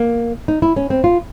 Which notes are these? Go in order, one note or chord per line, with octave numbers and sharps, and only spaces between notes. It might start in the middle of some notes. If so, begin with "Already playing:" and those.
Already playing: A#3
D#4
E4
C#4
C4
F4